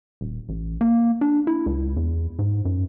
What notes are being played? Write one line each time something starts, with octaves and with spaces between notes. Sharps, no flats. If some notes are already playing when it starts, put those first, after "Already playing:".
D#1
A1
A#3
D4
E4
C#2
E2
G#2
F#2